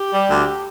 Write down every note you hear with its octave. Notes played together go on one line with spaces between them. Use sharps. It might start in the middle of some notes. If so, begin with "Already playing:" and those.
Already playing: G4
G3
D2